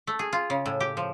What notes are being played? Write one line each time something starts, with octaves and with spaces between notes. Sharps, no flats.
A3
G#4
F4
C#3
A2
G4
F3